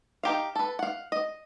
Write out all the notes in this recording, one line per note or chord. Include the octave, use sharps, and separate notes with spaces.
D#4 G4 F5
A4 B4
F5 F#5
D#5